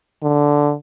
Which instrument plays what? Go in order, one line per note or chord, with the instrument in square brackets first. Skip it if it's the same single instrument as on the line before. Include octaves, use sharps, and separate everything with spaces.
[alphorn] D3